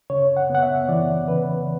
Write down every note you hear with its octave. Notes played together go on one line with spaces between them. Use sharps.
C#3 C#5
F#5
B3 F#5
E5
E3 D5
C#3 B4